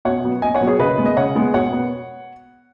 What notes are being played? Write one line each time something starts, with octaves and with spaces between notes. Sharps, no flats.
B2 C#5 F#5
F#3 B3
B2 D#5 G#5
C#5 F#5
F#3 B3
G#4 C#5
C#3 B4 D#5
G#3 B3
D#5
C#3 C#5 F#5
G#3 B3
B2 C#5 F#5
B3